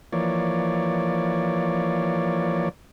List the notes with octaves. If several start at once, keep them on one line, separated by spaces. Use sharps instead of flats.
E3 F3 A#3 C#5 D5